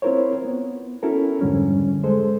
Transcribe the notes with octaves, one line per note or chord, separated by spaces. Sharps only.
C4 E4 F4 A#4 C5 C#5
B3
C#4 E4 F#4 A4 A#4
F2 G#2 D3 G3 C#4
G#3 G#4 A4 C5